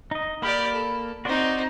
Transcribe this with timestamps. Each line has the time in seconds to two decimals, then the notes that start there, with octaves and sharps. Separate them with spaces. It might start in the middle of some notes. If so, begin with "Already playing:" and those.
0.11 D#4 D#5
0.42 A#3 G4 D5 B5 F6
0.73 A4
1.25 C4 D#4 F#4 D5 C6